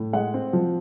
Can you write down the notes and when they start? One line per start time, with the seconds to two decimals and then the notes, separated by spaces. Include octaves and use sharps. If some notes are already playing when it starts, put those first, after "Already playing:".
Already playing: A2
0.13 G#3 F#5
0.34 C4
0.53 F3